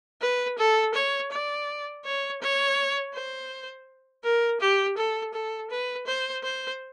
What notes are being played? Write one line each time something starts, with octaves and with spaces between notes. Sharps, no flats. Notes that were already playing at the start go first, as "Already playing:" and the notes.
B4
A4
C#5
D5
C#5
C#5
C5
A#4
G4
A4
A4
B4
C5
C5